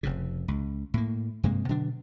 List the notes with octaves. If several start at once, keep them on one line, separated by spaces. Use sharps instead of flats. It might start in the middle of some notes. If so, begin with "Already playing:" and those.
F1 F2 C#3
C#2
A2 A#3
G2 C3 G#3 A#3
B2 D3 F#3 D4